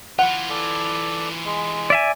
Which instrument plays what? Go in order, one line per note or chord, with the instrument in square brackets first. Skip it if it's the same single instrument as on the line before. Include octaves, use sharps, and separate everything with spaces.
[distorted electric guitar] E3 F4 [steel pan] F#5
[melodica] A4 D5
G#3
[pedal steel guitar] D5 E5 G#5